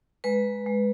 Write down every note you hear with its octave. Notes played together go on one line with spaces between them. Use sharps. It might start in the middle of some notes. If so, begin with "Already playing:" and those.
G#3 B4
G#3